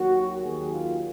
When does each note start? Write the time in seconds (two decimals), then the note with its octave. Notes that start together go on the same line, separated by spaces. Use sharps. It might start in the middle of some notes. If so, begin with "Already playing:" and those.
Already playing: D#2 D#3 F#3 F#4
0.43 D#2 D#3 F#3 G#4
0.72 F4